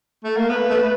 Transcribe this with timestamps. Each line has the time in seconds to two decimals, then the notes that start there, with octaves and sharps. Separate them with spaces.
0.24 A3
0.37 A#3
0.49 B3 B4
0.70 A3